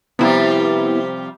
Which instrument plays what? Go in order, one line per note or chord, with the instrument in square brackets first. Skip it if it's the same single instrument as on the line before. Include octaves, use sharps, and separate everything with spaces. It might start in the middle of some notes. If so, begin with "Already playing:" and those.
[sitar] C3 F3 G3 [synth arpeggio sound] B3 E4